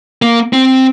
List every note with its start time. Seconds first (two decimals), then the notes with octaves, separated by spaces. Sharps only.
0.22 A#3
0.53 C4